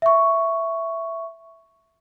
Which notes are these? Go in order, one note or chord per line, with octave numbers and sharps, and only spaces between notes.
E5 C#6